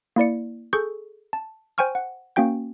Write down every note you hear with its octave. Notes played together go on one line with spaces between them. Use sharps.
A#3 E4 D5 C#7
G#4 A4 C#6 G6
A5
C5 G5 G#5 C#6 F6
F#5
A#3 C#4 F#4 G5 G6